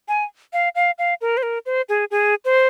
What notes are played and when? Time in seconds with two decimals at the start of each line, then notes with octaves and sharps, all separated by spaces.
0.08 G#5
0.53 F5
0.75 F5
0.98 F5
1.21 A#4
1.37 C5
1.43 A#4
1.66 C5
1.89 G#4
2.11 G#4
2.45 C5